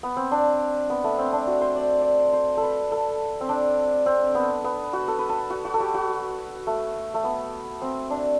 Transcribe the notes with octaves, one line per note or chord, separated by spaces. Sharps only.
B3
C4
D4
B3
A3
C4
D4
F#4
C5
D5
D5
C5
A4 B4
A4
C4
D4
C4
B3
B3
F#4
A4
B4
A4
F#4
F#4
A4
G4
F#4
A3
A3
B3
C4
D4